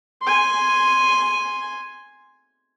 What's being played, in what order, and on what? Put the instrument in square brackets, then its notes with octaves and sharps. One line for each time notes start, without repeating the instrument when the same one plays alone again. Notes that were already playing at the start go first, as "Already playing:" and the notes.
[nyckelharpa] G#5 C6